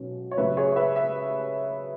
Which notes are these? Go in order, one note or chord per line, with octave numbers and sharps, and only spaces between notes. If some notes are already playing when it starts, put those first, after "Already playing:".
Already playing: B1 B2 F#3 C#4
C#5
F#1 F#2 C#3 F#3 B4 E5
G#4 C#5
B4 E5
E5